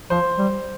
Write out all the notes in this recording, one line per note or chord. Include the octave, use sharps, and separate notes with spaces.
F3 C5
G3